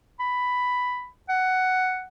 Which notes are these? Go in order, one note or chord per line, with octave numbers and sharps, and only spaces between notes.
B5
F#5